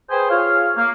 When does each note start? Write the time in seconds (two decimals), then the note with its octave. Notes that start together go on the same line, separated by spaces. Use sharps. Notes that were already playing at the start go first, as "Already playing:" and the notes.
0.10 G#4 B4 C5 G5 G#5
0.30 F4 G#4 C#5 F5
0.76 A#3